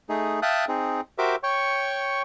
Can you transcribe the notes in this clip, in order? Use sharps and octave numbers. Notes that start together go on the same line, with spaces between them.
A3 D#4 G#4
E5 F5 G5 A5 D#6 F#6
C4 D#4 G#4
F#4 G4 A#4 C5 E5 D6
C#5 G5 C#6